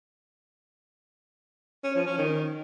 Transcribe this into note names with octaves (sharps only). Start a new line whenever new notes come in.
C#4
F3
C#4
D#3